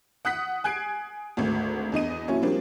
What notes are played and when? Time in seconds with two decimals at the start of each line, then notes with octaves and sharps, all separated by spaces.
0.25 F#5 D#6 F#6 B6
0.64 G#5 F#6 G#6 C7 D7
1.37 G#1 D2
1.92 E2 D4 D#5 D#7
2.28 A#2 F#3 C#4 E4
2.42 F3 G3 A#3 C4 D4